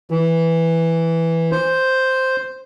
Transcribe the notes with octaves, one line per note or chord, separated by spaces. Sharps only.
E3
C5